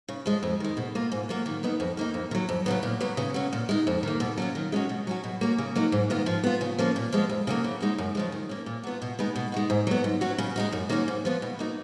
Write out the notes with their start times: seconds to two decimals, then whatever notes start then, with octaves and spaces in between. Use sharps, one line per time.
0.08 C#3
0.26 F3 G#3
0.43 F2
0.60 D#3 G#3
0.77 B2
0.95 A#3 F4
1.12 G#2
1.29 F#3 A#3 F4
1.46 D#3
1.63 F#3 B3 D#4
1.80 F2
1.97 D#3 A#3 D#4
2.14 F2
2.31 D#3
2.35 F#3
2.49 F2
2.66 C#3 F#3 B3
2.83 A#2
3.01 F#3 B3
3.17 C#3
3.34 F#3 C#4
3.53 A#2
3.69 G#3 D#4
3.87 F2
4.03 D#3 A#3
4.20 B2
4.38 F#3 C#4 F4
4.55 D#3
4.72 G#3 C#4 F#4
4.89 B2
5.07 F#3 C#4 F#4
5.24 B2
5.41 A#3 C#4 F#4
5.58 C#3
5.76 F#3 A#3 D#4
5.92 G#2
6.10 D#3 G#3 B3 F4
6.26 F3
6.44 B3 F4
6.61 C#3
6.78 F3 A#3 C#4
6.96 A#2
7.12 F3 G#3 B3
7.29 F2
7.47 C#3 F#3 A#3
7.64 C#3
7.81 G#3 D#4 F#4
7.98 F#2
8.15 C#3 F3 G#3
8.32 D#3
8.49 A#3 C#4
8.66 A#2
8.83 F#3 B3 F4
9.02 B2
9.19 G#3 B3 D#4
9.36 B2
9.52 G#3 D#4 F#4
9.70 G#2
9.87 F#3 B3
10.04 G#2
10.21 F#3 C#4 F#4
10.38 C#3
10.56 G#3 D#4 F#4
10.72 F#2
10.89 D#3 A#3 C#4 F#4
11.08 G#2
11.25 F3 B3 F4
11.42 B2
11.59 A#3 D#4 F#4